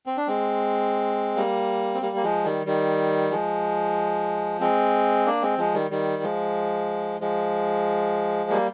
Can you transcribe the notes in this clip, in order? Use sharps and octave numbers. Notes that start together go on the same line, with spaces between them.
C4
D4
G#3 C4
G3 A#3
C4
G3 A#3
A#3
F3 G#3
D#3 G3
D#3 G3
F3 G#3
G#3 C4
A#3 D4
G#3 C4
F3 G#3
D#3 G3
D#3 G3
F3 G#3
F3 G#3
G3 A#3